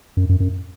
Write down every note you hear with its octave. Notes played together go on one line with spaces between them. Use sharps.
F#2
F#2
F#2